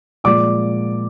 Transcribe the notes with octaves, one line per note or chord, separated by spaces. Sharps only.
A#2 F3 G#3 D5 D6